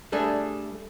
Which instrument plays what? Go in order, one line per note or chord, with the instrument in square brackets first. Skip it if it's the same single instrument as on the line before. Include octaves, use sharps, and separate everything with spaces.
[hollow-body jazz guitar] G3 A3 D4 G#4